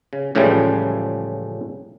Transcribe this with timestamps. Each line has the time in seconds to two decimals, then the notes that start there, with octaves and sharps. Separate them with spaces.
0.13 C#3
0.35 C#2 A2 C#3 E3 F3 G3